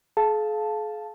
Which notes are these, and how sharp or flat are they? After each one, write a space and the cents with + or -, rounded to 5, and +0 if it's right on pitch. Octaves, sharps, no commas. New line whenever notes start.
G#4 +45 F5 +0 A5 +0